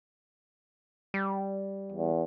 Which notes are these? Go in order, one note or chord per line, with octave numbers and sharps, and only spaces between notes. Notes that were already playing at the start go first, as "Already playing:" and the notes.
G3
E2